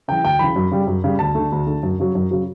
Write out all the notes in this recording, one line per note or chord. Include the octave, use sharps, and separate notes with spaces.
C#3 E3 G5
D2 G5
C#3 E3 B5
F#2
C#3 G3
F#2
C#3 G3
D2 A5
D3 A3
D2
D3 A3
F#2
C#3 F#3
F#2
C#3 F#3